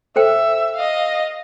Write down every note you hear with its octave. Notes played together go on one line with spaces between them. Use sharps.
A4 C5 E5 G5
D#5 F5